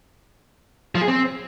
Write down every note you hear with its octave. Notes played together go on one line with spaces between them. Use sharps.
F3
G#4
C4